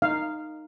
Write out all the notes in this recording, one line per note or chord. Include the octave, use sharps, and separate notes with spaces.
D#4 F5